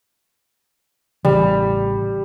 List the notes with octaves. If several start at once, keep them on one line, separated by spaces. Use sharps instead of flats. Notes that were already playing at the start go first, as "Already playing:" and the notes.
A1 C#3 E3 G3